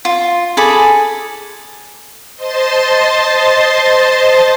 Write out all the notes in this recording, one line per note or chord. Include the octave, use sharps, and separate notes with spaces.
F4
G#4 A4 B5 D6
C5 D#5 A5 C6 A6